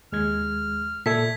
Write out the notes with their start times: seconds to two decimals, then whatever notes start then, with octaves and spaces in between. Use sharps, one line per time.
0.12 D#2 G#3 F6 G#6
1.06 A#2 A4 E5 G#6 B6